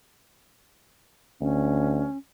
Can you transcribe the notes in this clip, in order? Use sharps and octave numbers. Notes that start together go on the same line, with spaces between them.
D2 C#4